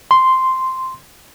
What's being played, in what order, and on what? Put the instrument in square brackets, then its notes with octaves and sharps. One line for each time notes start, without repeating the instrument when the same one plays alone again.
[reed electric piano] C6